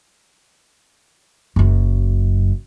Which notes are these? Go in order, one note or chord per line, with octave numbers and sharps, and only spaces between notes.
F#1 F#2